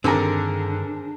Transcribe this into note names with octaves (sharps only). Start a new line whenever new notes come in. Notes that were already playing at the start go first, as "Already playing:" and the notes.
G2 D3 D#3 C4 D4 G4 G#4 A#4